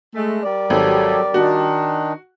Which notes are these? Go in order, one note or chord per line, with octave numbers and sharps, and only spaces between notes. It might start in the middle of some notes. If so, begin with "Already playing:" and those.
G#3 A3
G3 A#4 D5
G#1 F#3 G4 A4
D#3 D4 D#4 F#4